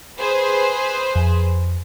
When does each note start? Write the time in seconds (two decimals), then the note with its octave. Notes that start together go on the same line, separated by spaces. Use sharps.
0.19 G#4 B4 C5
1.15 F2